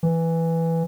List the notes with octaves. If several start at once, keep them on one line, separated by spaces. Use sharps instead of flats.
E3